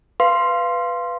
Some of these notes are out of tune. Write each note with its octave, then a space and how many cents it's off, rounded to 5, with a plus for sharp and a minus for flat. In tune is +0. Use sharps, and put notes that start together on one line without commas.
B4 +0 F5 -15 C6 +0